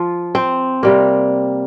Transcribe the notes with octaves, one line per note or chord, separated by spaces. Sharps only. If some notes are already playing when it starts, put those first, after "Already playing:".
Already playing: F3 F4
C4
C3 G3 A#3